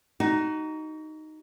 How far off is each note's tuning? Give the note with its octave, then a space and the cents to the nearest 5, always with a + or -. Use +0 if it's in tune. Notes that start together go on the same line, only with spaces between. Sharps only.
D#4 +0 F#4 +35